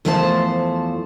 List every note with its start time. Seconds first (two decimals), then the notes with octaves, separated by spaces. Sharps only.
0.05 E2 F3 A3 C5 D5 A5